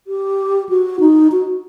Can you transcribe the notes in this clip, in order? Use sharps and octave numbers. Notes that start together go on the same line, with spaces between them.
G4
F#4
D#4
F#4